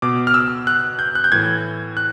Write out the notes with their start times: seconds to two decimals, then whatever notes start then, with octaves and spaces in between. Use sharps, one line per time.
0.02 B2 D6
0.27 F6
0.34 E6
0.67 F#6
0.99 G6
1.15 F#6
1.24 G6
1.32 A2 E3 G#6
1.97 F#6